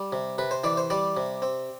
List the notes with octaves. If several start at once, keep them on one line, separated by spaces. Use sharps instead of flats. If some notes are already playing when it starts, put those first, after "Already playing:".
Already playing: G3
C3
C3 B4
C5
E3 D5
C5
G3 D5
C3
C4